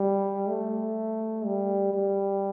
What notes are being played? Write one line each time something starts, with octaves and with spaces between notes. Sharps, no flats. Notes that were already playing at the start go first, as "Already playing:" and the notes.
Already playing: G3
A3
G3
G3